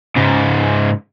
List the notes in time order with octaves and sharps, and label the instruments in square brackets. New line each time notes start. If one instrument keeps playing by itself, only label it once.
[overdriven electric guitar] G#2 C#3